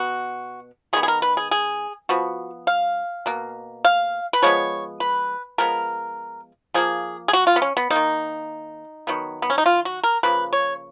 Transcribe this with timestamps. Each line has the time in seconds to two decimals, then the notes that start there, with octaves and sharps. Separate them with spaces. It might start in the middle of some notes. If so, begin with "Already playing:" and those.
Already playing: B2 B3 F#4
0.93 D#3 G#3 B3 G#4
1.03 G#4
1.08 A#4
1.22 B4
1.37 G#4
1.51 G#4
2.09 F3 B3 F#4
2.67 F5
3.26 B2 A#3
3.85 F5
4.33 B4
4.42 F3 G#3 B3 C#5
5.00 B4
5.58 F3 G#3 B3 A#4
6.74 F3 A#3 G#4
7.28 G#4
7.33 F#4
7.47 F4
7.56 B3
7.62 C#4
7.77 B3
7.90 A#3 D#4
7.96 D#3
9.07 D#3 F#3 B3
9.42 B3
9.50 C#4
9.58 D#4
9.66 F4
9.85 F#4
10.04 A#4
10.23 C#3 F3 A#3 B4
10.53 C#5